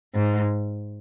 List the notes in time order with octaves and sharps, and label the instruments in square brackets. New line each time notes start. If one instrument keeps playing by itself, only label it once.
[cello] G#2